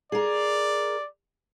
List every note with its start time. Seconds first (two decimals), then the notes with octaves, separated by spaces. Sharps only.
0.12 G#4 A#4 D5